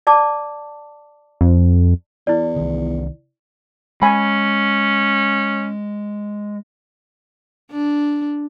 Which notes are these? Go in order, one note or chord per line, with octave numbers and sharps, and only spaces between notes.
D5 A5 D6
F2
E2 E4 D5
C2 D#3
G#3 C#4 G#5 B5
D4